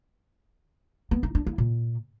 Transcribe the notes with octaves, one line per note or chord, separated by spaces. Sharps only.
B3
D#4
D4
E4
A#2